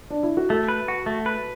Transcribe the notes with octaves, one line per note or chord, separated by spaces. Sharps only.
D4
E4
F#4
A3 A4
B4
F#4
A3
B4